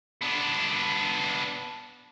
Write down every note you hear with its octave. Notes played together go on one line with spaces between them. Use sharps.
B3 D4